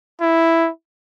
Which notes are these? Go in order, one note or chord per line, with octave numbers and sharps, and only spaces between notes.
E4